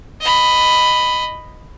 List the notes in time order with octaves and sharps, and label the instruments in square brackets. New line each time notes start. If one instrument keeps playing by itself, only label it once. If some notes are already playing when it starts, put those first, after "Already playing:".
[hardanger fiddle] D#5 B5